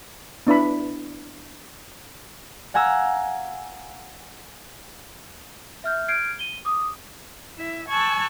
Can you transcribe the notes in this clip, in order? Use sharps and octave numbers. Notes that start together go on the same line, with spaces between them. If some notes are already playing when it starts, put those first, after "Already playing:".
B3 D4 E4 B5
F5 F#5 G#5 A#5 E6
E5 F6 G6
F6 G6 G#6 C7 D7
D#7 G7
D6 D#6
E4 E5
G#5 A5 C#6 E6 F#6